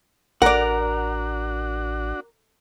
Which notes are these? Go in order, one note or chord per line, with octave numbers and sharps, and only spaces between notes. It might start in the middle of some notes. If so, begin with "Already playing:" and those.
A1 D4 F#4 A#4 D5 F#5